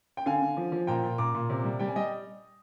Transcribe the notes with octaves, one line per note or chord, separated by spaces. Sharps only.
G5
D3 F5 G#5
D3
F3
F3
A#2 G5 A#5
A#2
A#2 A#5 D6
A#2
C3
G3
G3 G5
G#5
G3 D#5 G5